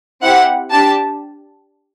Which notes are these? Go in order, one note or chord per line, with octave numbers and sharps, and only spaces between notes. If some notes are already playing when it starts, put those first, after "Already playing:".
C4 E4 G4 F#5
D4 G4 A5